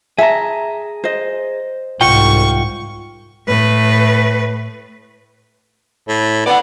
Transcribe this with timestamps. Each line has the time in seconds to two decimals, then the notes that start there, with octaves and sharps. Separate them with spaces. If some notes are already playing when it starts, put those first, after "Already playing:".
0.18 G#4 E5 A5 A#5
1.04 C5 D#5
2.01 C2 G#2 F4 F#5 G5 C#6
3.47 A2 B4
6.08 A2
6.46 B3 D5 F#5